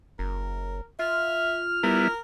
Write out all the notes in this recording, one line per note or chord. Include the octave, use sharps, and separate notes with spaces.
F#1 A#4
F4 E5 F6
G3 B3 E4 A#4